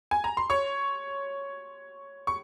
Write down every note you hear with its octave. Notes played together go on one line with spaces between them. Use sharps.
G#5
A#5
C6
C#5 C#6
C#6